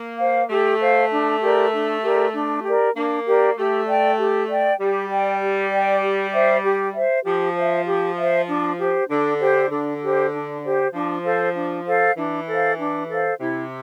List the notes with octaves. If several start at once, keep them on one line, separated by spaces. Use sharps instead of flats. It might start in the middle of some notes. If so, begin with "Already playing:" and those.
Already playing: A#3
C5 F5
A3 G4
C5 F5
D4
G4 A#4 D5
D4
G4 A#4 D5
D4
G4 A#4 D5
A#3 D4
G4 A#4 D5
A3 G4
D5 G5
G4
D5 G5
G3 G4
D5 G5
G4
D5 G5
G4
C5 E5
G4
C5 E5
F3 G4
C5 E5
G4
C5 E5
D4
G4 C5
D3 D4
G4 C5
D3 D4
G4 C5
D4
G4 C5
F3 D4
A4 C5 F5
D4
A4 C5 F5
E3 D4
A4 C5 F5
D4
A4 C5 F5
C3 E4